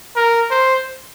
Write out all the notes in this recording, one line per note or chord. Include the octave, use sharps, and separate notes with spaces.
A#4
C5